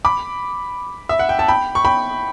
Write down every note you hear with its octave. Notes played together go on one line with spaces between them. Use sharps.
B5 D6
E5
F#5
G5
A5
G5 B5
C#6
G5 B5